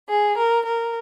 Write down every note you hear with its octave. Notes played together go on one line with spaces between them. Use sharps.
G#4
A#4
A#4